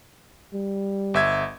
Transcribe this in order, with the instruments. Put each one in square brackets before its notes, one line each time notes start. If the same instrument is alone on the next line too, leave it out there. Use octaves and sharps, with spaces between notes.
[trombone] G3
[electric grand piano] G1 E5 G#6